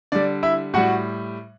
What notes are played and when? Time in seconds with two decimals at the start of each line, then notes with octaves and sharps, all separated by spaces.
0.12 D3 G3 D5
0.43 E4 E5
0.74 A2 G3 F#4 F#5